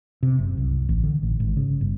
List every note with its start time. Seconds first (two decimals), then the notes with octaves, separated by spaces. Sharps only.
0.23 C3
0.38 F#1
0.57 C2
0.89 A1
1.03 D3
1.23 A1
1.40 G#1
1.57 C#3
1.81 G1